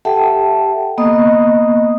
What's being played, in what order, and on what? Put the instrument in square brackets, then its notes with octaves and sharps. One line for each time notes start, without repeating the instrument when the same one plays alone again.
[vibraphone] G4 A4 E5 F#5 G5 A5
A#3 B3 D#5 D#6